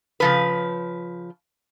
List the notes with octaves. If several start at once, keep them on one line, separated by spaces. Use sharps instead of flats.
C#3 F3 B4